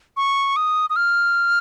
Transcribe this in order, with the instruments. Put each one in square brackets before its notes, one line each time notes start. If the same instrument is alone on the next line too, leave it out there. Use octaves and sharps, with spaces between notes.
[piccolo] C#6
D#6
D#6
F6